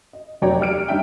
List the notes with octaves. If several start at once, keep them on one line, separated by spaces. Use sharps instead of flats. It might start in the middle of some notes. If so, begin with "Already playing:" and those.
D#5
F1 F#3 C#5 D5 G5 A#5
G4 D5 F6 D7
G3 D4 D#4 E5 G5